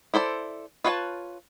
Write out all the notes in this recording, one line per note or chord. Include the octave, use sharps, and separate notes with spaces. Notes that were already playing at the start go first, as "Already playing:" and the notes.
E4 A4 C5 D5
F4 B4 C#5 F5 A5